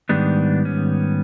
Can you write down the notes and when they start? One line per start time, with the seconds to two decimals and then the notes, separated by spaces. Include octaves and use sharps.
0.09 G#2 D#3 G3 B3 D4
0.65 C#4